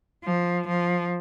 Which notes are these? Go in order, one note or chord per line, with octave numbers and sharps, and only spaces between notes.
F3
F3